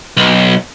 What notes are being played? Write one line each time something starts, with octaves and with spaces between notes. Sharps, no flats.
B1